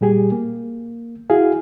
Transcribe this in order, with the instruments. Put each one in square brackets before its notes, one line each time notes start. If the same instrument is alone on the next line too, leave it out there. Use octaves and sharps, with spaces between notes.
[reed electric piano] A#2 G3 G4 G#4
A#3
E4 F#4 G#4 F5